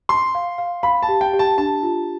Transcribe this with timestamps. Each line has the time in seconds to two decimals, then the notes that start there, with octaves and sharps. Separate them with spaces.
0.09 A5 C6
0.35 F5
0.58 F5
0.83 F5 B5
1.03 A5
1.09 G4
1.21 G5
1.33 G4
1.39 A5
1.58 D4 A5
1.83 F4